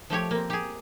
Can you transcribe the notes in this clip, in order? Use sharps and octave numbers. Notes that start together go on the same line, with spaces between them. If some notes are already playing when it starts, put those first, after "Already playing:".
F3 A3 G4 C#5
A#3 C4
G4 G#4